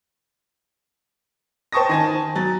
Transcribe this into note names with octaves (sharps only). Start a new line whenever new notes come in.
C5 G5 A5 C#6 D#6 A#6
D#3 G#5 A5
F#3 A6